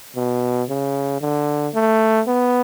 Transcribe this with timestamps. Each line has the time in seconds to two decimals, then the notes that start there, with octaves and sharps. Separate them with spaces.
0.16 B2
0.69 C#3
1.21 D3
1.74 A3
2.27 B3